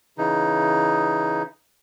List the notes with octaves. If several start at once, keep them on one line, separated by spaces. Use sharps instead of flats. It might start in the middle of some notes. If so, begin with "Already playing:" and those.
C#3 E3 D#4